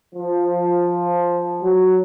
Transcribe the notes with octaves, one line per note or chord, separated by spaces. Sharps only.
F3
F#3